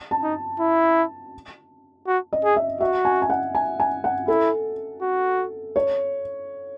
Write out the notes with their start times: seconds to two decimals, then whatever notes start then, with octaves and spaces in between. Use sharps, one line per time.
0.11 A5
0.23 D#4
0.60 E4
2.07 F#4
2.33 D#5
2.45 G#4
2.56 E5
2.80 F#4 E5
3.05 G#5
3.22 G#5
3.30 F#5
3.55 G#5
3.80 G#5
4.04 F#5
4.28 E4 A4
5.02 F#4
5.76 C#5